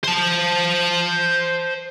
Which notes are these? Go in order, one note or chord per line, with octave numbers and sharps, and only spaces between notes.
C5 A5